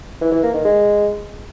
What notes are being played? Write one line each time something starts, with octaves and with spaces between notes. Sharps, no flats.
E3
E3
A#3
D#3
G#3